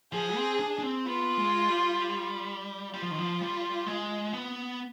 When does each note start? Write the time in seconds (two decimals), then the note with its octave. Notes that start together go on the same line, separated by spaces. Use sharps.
0.13 F3 G#4
0.36 C4
0.59 D4
0.79 D4
0.83 C4
1.06 B3 F4
1.38 G#3
1.69 G3
2.93 G3 F4
3.02 F3
3.11 D#3
3.18 F3
3.41 G3
3.86 G#3
4.33 B3